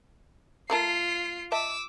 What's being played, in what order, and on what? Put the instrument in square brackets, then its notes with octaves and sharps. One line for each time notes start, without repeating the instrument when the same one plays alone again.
[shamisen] A3 A#4 A5 [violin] F4 C7
[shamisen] D#5 E5 A5 [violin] D6 E6